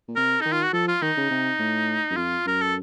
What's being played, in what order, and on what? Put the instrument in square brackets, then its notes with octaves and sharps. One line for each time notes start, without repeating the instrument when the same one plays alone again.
[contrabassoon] A#2
[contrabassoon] C3 [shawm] A#4
[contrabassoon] D#3 [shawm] D#4
[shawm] F4
F#4
[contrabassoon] F3 [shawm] A4
[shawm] F4
[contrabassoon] D#3 [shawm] D#4
[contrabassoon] C#3
C3
A2
F#2
[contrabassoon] F2 [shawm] F4
[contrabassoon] F#2 [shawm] A#4
[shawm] A4